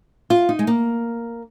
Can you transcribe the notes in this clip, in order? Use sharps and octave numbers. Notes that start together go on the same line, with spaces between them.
F4
D#4
G#3
A#3